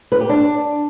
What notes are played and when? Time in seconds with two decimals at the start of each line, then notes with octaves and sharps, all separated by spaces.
0.12 B4
0.20 G4
0.29 D4